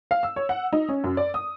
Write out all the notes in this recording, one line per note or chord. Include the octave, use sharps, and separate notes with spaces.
F5
E6
C#5
F#5
D#4
C#4
F#2
D5
D#6